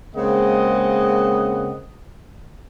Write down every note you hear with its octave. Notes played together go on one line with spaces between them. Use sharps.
C#3 G#3 A#3 C4 D#5 F#5